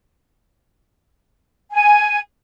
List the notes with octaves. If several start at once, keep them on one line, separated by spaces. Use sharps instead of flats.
G#5